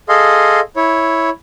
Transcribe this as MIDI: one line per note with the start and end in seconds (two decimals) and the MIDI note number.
0.09 0.60 68
0.09 0.60 69
0.09 0.60 75
0.09 0.60 77
0.09 0.60 84
0.76 1.30 64
0.76 1.30 73